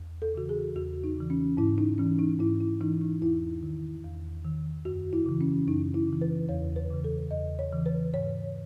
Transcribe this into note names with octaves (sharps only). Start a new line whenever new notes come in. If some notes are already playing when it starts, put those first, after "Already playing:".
Already playing: E2
A4
C#3 E3 F#4
G#4
E2 F#4
D#4
C#3 E3
C#4
G#2 E4
D#4
E3 C#4
D#4
G#2 E4
E4
E3 D#4
D#4
E2 E4
D#3
E2
D#3
F#2 F#4
E4
C#3 E3
C#4
F#2 D#4
E4
C#3 E3
B4
E2 C#5
B4
C#3 E3
A4
E2 D#5
C#5
C#3 E3
B4
G#2 C#5